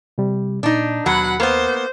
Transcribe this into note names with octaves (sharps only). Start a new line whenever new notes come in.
C3 G3
A#2 D4 D#4
D#2 B2 F#3 F#5 B5
A#3 B3 C5